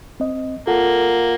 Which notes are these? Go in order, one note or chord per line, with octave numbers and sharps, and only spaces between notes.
C4 D#5
A#3 F4 A4 F#5